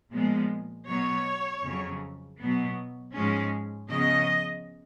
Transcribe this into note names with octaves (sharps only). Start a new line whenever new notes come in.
A#2 F3 G#3 B3
B2 F#3 B3 C#5
F2 C#3 F#3
B2 F#3 B3
G#2 F3 G#3 C#4
C#3 F3 B3 D#5